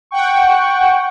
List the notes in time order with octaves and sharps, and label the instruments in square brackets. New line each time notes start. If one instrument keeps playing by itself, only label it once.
[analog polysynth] F#5 G5 C#6